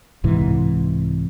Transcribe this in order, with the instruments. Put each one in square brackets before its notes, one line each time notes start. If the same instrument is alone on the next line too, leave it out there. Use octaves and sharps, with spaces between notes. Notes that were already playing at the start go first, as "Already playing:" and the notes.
[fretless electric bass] C2 G#2 C3 E3